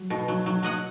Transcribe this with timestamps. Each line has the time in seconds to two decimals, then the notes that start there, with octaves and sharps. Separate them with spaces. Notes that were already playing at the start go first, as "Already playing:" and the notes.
Already playing: F#3
0.10 B2
0.28 F#3
0.46 F#3
0.63 F#3 D#5 F#5